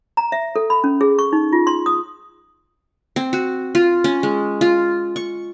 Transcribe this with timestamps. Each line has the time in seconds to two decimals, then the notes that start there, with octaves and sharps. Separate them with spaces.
0.17 A#5
0.32 E5
0.56 A4
0.70 B5
0.84 C#4
1.01 G#4
1.19 C#6
1.33 D#4
1.52 F4
1.67 C6
1.86 D#6
3.16 C4
3.33 F#4
3.75 F4
4.04 C#4
4.23 G#3
4.61 F4
5.16 C#6